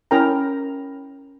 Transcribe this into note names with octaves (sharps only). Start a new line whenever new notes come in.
C#4 E4 A#4 G5 A#5